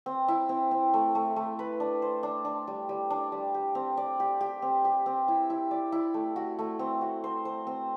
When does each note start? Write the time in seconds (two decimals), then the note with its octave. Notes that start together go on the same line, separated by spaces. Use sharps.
0.06 C4
0.28 E4
0.49 C4
0.71 C4
0.94 A3
1.15 A3
1.36 A3
1.59 B4
1.80 D4
2.02 C5
2.23 D4
2.45 D4
2.67 G3
2.89 G3
3.10 D4
3.32 G3
3.54 G4
3.75 C4
3.97 D5
4.20 G4
4.41 G4
4.62 C4
4.85 G4
5.06 C4
5.28 E4
5.50 E4
5.71 D5
5.92 E4
6.14 A3
6.36 F#4
6.59 A3
6.79 C4
7.01 F#4
7.24 C5
7.45 C5
7.67 C4